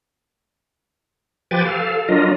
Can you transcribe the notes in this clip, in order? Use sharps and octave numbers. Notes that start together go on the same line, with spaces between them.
F3 G4 B4 G5 G#5 A6
A4 F5
F#3 D4 F4 A#4 D#5